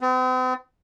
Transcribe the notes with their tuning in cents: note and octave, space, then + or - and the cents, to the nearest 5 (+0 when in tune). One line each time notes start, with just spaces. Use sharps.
C4 -45